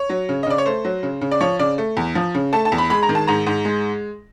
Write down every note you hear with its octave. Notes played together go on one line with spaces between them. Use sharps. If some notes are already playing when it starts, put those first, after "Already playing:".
Already playing: C#5
F#3
C#3
D#5
C#3 D5
C#5
A3 C5
F#3
C#3
C#3
D5
F3 C#5
C#3 D5
A3
E2
F3
C#3
A3 A5
A5
E2
B5
G#3 B5
A#5
D#3
A5
G#2 A#5
G#2
G#3